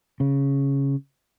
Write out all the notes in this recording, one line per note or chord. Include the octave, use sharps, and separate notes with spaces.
C#3